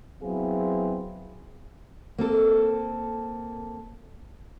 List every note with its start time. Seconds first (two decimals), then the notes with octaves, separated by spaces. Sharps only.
0.22 F#3 B3 C4 E4 G#4 F5
2.19 A#3 C4 A4